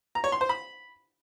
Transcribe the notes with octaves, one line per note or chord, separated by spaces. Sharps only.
A#5
C#5
C6
C5
B5